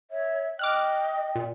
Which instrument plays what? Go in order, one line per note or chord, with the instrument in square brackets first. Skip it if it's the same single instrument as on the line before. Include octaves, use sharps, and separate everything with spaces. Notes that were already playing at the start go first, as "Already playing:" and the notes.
[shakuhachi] C#5 [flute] E5
[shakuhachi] D#5 [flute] G5 [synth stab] D6 F6 F#6
[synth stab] A#2